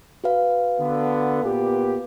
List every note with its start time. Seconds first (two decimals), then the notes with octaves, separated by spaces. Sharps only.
0.24 F#4 B4 F5
0.79 D3 B3
1.43 A#2 B3 G4